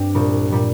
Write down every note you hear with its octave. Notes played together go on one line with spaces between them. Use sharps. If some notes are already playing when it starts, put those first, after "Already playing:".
Already playing: G2 C4 G4
C2 A#2 G3
A#2 G3